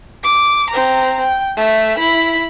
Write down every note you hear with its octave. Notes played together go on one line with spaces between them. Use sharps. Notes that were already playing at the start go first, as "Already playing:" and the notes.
D6
C4 A#5
G5
A3 E5
E4 B5